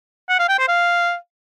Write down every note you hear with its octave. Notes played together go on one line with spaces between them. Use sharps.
F#5
F5
G5
C5
F5